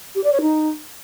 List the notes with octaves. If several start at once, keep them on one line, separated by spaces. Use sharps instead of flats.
G4
D5
C#5
D#4